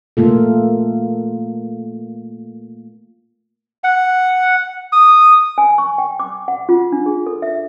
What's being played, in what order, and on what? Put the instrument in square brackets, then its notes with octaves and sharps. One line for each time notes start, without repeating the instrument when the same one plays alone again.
[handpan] A3 A#3 F4 A4
[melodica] F#5
D#6
[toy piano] G#5
C#6
G5
D6
F#5
F4
D4
G#4
A4
E5